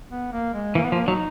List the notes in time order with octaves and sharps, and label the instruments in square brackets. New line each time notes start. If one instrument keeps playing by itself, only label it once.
[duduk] B3
A#3
G#3
[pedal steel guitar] E3 [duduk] A#3
[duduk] B3
[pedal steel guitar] F3 [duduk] A#3
[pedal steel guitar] F#3 [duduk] D#4